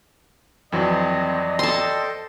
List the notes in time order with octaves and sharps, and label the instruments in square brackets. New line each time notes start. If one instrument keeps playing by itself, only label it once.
[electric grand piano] F2 E3 F#3 [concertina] C4 [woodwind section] D5 D#5
[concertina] A4 C5 G5 [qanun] A5 C6